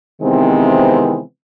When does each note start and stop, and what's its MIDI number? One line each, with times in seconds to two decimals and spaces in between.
0.22 1.20 48
0.22 1.20 51
0.22 1.20 52
0.22 1.20 56
0.22 1.20 59
0.22 1.20 60